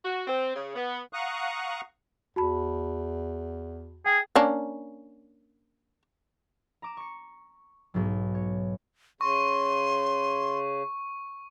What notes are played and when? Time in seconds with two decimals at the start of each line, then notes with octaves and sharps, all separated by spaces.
0.05 F#4
0.28 C4
0.55 C#3
0.76 B3
1.13 F5 F#5 A#5 C#6 D#6 F#6
2.36 E2 F#4 A5 B5
4.06 G#4 G5
4.36 A#3 C#4 D4
6.82 A#5 D6 E7
6.97 C#6 C#7
7.94 B1 G#2 F#3
8.34 C#5
9.21 C#3 C6 C#6